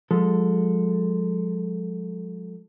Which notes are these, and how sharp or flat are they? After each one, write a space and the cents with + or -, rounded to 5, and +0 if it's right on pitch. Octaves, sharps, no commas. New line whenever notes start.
F3 +45 G#3 +0 A4 +0